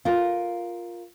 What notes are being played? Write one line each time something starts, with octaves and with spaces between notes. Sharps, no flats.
F4 A#4